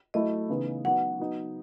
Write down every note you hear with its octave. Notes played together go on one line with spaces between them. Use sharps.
F#3 A3 E4 D#5
C#3 E3 B3 D#4
F#3 B3 D#4 F#4 F#5
F#3 B3 D#4